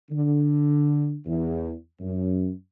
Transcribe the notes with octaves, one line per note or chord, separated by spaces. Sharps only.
D3
E2
F#2